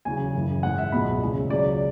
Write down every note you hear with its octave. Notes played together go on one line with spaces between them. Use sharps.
E2 C#3 F#3 G#5
F#2 C#3 E3
G#2 E3 G#3 F#5
E5
C#2 B2 F#3 B5
E2 C#3 G#3
C#2 C#3 F#3 D5